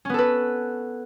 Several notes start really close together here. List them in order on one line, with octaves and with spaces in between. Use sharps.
C#4 B3 A4 B4